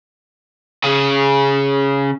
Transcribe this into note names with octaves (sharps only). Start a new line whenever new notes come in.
C#3 G#4